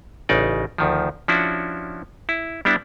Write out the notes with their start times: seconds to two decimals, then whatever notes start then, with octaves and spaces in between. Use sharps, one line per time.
0.29 A1 C#3 D#4 D5
0.78 D2 D#3 F3
1.28 F3 C#4 D4 E4 F#4
2.29 E4
2.65 G3 B3 D4 E4